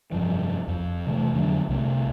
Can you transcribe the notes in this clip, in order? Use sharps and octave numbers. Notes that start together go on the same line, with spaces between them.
F1 G2 F3
F2
C3 E3 G#3 A3
F2 D3 F#3
C2 C3 A3